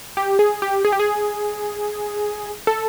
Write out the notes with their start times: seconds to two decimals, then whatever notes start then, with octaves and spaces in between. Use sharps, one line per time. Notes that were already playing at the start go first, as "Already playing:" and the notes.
0.17 G4
0.39 G#4
0.62 G4
0.85 G#4
0.92 G4
1.00 G#4
2.67 A4